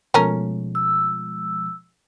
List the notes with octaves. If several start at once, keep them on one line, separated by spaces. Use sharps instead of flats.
B2 F3 G#3 A3 C#4 A#4
E6